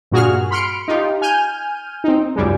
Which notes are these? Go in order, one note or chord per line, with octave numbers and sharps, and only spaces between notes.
G2 A#2 F#4 G#4 F6
B5 C6 F6 C#7 D7
D#4 F4 G4
G#5 F6 G6 D#7
C4 D#4
C#2 F#2 G3 G#3